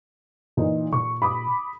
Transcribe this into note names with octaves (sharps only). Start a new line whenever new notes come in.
A#2 E3 D#4
A#2 C#6
B5 D6 D#6